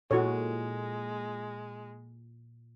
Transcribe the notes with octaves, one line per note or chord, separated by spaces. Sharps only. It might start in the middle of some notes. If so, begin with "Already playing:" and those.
A#2 G#3 E4 F#4 A4 C#5